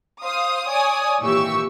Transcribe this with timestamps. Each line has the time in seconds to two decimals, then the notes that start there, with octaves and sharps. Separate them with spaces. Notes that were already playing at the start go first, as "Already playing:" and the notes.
0.23 C5 F5 D#6
0.68 C#5 D5 G#5 D#6
1.21 G#1 A#2 E3 G4 C#6 E6